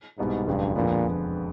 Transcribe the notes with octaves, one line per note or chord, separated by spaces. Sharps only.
C2 G#2 B2 G3 B3 D#4
E1 D2 G2 C#3 F3 G#3
F2 A#2 D3 F3 G#3 B3